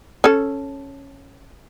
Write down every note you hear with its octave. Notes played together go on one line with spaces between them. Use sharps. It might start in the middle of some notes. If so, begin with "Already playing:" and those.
C#4 A4